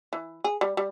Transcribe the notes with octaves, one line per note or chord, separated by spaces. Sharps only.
E3
G#4
G3
G3